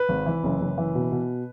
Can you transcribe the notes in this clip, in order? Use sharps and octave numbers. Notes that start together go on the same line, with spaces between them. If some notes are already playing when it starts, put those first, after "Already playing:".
Already playing: B4
G#1
E3
F#1
F#1
E3
B2
B2